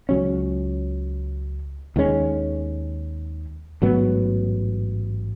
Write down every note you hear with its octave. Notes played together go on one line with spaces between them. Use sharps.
C#2 C#3 F#3 C#4
D#2 D#3 G#3 C#4
A1 G#2 F#3 B3